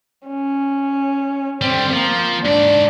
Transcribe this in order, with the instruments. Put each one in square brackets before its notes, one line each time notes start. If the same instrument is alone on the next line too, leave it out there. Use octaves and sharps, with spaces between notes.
[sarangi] C#4
[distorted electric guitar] D3 G3 [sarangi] C4
[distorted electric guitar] F3 [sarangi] A#3
[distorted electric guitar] G#2 D5 [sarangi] D4